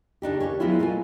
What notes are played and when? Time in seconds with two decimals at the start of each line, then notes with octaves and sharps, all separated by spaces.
0.22 C#3 D4 D#4 G4
0.40 D#2 C#4 G4 C#5
0.60 F#3 G#3 B3 E4 F4
0.79 B2 A#3 F4 A4 G#5